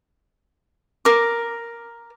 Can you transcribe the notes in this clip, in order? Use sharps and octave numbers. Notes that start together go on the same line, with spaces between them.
A#4 D6